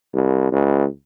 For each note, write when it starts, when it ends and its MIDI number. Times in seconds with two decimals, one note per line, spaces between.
0.14 0.51 36
0.52 0.85 37